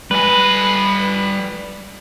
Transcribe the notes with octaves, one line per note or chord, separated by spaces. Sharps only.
G3 B4 G#5